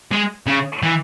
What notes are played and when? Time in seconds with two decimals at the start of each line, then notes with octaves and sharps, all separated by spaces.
0.11 G#3
0.47 C#3
0.83 E3